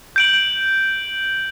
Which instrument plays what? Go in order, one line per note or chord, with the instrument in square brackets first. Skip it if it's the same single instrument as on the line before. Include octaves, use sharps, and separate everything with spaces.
[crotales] G6 D7 F#7